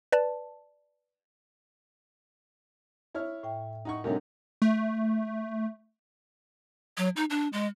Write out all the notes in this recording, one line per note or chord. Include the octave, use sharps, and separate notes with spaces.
B4 D5 A5
E4 C#5 F6
A2 E5 G5
D#4 F#5 C#6
F#2 C3 G3 A3 D4 D#4
A3
F#3
D#4
D4
G#3